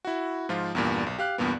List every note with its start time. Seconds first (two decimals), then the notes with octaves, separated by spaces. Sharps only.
0.05 E4 F#4
0.49 G#2 F3 F4
0.75 E2 G2 A#2
1.06 B1
1.18 G4 F5 F#6
1.38 E2 G2 A#2 B3